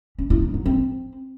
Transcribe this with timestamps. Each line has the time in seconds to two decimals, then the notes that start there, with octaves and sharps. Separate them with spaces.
0.19 C#4
0.30 E4
0.42 D#4
0.54 F#3
0.66 C4